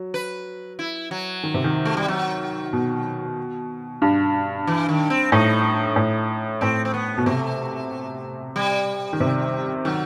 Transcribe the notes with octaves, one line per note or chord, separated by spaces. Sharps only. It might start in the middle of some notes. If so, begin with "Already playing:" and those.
Already playing: F#3
B4
E4
F#3
D#3
C3
D#3
A3
G3
F#3
B2
G2
E3
D#3
C4
A2 D#4
A2
A2 C4
C4
B3
B2
C3 A3
G3
D#3
C3
D#3 F#3